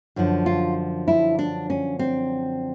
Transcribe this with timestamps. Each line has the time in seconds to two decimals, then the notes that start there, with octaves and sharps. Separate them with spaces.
0.16 F#2 D3 F3
0.46 F4
1.08 E4
1.39 D4
1.70 C#4
1.99 C4